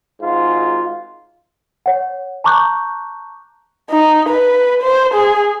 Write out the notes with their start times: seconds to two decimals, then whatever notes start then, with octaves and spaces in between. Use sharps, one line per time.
0.22 G#1 G#2 F4
1.86 C#5 F#5
2.44 A5 A#5 C#6 D6 F#6 G6
3.90 D#4
4.28 B4
4.82 C5
5.14 G#4